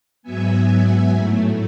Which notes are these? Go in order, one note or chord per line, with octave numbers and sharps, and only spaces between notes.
G#2 F#3 B3 E5 G#5
A2 F#3 A3